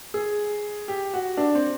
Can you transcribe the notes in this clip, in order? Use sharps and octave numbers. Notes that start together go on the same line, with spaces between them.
G#4
G4
F#4
D4
C4